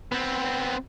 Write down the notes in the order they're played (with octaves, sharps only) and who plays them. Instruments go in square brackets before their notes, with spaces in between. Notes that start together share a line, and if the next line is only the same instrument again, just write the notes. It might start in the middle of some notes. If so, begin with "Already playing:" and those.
[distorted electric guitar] B3 C4